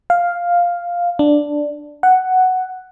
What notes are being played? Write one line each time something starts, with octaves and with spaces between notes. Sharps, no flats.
F5
D4
F#5